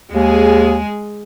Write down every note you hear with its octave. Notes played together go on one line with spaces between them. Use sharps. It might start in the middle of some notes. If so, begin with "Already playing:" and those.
D#2 G#3 G#4